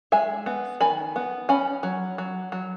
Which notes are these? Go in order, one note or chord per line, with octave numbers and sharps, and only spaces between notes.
G#3 E5 G#5
B3
D#3 G#5 B5
B3
C#4 G#5 B5
F#3
F#3
F#3